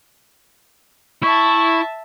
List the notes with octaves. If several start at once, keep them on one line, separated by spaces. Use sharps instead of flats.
E4 E5 A5 C#6